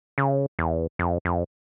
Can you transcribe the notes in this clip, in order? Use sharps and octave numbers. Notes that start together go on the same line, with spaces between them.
C#3
E2
F2
F2